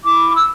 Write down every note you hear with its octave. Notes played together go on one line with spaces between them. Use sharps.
E4 D6
E6